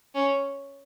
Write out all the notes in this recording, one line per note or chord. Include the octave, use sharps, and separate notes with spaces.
C#4